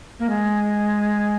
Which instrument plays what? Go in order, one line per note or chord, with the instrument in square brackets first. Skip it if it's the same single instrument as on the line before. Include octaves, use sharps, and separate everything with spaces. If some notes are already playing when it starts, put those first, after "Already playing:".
[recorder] A#3
G#3